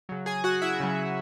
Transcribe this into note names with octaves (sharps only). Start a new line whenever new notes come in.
C#3 F#3
G#4 G#5
F#4 F#5
E4 E5
C#3 F#3